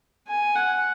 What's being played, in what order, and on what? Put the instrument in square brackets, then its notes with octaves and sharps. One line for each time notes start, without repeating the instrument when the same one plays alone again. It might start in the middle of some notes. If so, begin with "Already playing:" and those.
[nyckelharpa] G#5
F#5